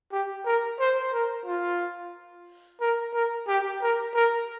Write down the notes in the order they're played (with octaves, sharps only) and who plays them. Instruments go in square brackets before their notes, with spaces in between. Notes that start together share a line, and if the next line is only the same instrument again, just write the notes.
[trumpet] G4
A#4
C5
A#4
F4
A#4
A#4
G4
A#4
A#4